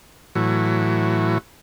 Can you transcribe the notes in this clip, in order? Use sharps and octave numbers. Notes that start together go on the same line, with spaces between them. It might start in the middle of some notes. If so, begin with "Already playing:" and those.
A2 E3 F#3